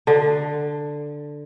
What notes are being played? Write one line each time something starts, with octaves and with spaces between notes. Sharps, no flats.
D3